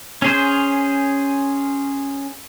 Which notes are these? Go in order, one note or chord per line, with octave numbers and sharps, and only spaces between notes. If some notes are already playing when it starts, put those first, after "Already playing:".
C#4 G#4 C5